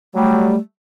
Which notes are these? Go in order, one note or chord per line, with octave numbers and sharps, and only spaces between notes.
F#3 G3 A3